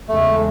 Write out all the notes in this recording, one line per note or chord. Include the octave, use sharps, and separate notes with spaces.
E2 C#3 G#3 A3